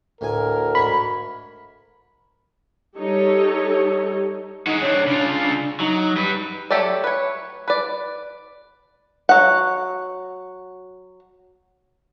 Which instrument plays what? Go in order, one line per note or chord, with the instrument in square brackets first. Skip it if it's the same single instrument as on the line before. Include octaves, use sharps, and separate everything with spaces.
[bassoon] D2 [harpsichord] A2 G#5 [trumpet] A#4
[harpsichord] G#2 C#5 A5 [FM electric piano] B5
[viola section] G3 D#4 G4 A4 C#5
[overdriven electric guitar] G#3 F#4 [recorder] D#4
[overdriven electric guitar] C4 D4 [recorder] C#5
[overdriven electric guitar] C#3 F4 [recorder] D4
[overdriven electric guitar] F#3 [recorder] D#4
[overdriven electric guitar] G3 B4
[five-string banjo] F#3 A3 G4 A4 D5
B4 C#5
B4 D5
F#3 F#5